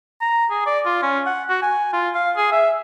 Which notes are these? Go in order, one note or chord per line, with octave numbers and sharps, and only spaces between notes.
A#5
G#4
D5
F4
C#4
F#5
F#4
G#5
F4
F5
G#4
E5